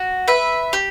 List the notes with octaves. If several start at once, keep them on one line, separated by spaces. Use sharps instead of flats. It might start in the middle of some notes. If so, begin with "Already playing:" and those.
Already playing: F#4
B4 E5
G4